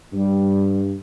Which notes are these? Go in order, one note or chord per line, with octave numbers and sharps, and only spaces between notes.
G2 G3